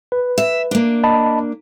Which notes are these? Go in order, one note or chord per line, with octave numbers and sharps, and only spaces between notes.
B4
E5
A#3 D4
D#5 A5 B5